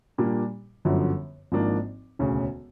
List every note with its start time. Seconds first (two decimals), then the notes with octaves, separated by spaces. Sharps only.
0.18 A#2 G3 A#3 D4
0.85 G1 F#2 D3 F3
1.52 G#1 G#2 F3 A#3 D4
2.19 E1 D2 C#3